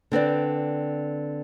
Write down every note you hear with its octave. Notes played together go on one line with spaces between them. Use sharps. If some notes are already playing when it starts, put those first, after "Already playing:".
D3 C4 B4 D5